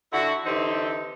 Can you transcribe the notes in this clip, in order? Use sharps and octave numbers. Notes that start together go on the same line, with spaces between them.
D3 E4 F#4
D3 E3 C4 D#4 G4